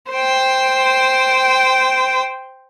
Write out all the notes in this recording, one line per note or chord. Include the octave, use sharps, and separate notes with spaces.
C5 G5